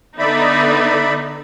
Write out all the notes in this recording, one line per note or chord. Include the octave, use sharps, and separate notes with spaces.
D3 B3 D#4 D5 E5 B5